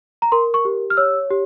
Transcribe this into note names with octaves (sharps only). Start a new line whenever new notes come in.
A#5
A#4 C6
C#6
G4
F6
C#5 E6
G4